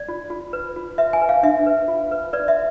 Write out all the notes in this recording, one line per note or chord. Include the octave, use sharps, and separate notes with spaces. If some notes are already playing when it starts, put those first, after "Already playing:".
Already playing: D5
F4
F4
B4
F4
B4 E5
G#5
B4
F5
D4 E5
B4
F4
B4
B4 D5
E5